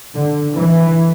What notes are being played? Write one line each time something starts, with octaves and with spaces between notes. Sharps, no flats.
D3
E3